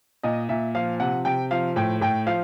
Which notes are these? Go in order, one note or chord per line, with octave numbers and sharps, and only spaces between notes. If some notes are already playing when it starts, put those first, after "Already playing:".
A#2 D#5
A#2 E5
F3 F5
C3 F#5
C3 G5
F3 F5
A2 G5
A2 G5
F3 F5